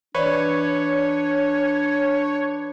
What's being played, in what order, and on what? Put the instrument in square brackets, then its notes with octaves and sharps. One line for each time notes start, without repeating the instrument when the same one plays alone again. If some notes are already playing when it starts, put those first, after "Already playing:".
[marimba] E3 D5 [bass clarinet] D4 [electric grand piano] B4 [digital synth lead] C#5